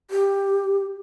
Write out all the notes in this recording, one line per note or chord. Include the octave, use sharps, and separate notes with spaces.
G4